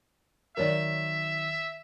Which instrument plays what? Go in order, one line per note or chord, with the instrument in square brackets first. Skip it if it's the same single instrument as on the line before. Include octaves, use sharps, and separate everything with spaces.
[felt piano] D#3 F#3 [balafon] A#4 C#5 D5 [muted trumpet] E5